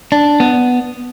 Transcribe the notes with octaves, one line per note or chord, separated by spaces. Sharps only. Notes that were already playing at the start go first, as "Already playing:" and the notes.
D4
B3